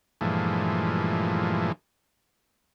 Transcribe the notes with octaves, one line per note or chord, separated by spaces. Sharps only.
G2 A#2 E3 F3 G#3 A3